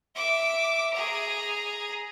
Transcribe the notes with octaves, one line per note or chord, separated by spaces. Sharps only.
E5 D6
G#4 A#5